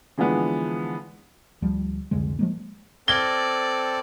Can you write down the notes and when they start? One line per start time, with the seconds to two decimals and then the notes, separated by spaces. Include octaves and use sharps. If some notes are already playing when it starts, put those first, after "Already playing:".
0.18 D3 E3 F3 G#3 B3
1.62 D2 F3 G3
2.11 C2 F2 D3 G#3
2.39 F3 G#3 A#3
3.08 C4 A4 D5 F6 G#6 A#6 G7